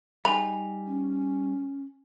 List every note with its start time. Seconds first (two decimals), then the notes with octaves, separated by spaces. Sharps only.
0.25 G3 D#4 G#4 G#5 B5 F7
0.87 C#4